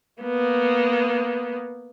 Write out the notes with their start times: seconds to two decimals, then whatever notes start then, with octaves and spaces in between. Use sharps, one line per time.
0.22 A#3 B3